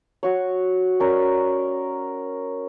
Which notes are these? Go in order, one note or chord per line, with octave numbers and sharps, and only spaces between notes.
F#4 C#5
C#4 A#4 D5